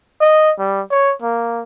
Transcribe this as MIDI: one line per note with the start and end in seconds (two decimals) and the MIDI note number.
0.21 0.51 75
0.59 0.81 55
0.91 1.14 73
1.22 1.63 58